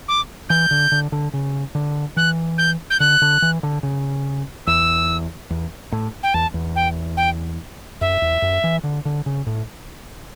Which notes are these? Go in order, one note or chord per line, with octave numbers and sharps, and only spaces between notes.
D6
E3 G6
D3
D3
D3
C#3
D3
E3 F#6
G6
G6
D3 F#6
D3
E3
D3
C#3
E2 E6
E2
A2
G5
E2 A5
E2
G5
G5
F#2 E5
E2
F#2
E3
D3
D3
C#3
A2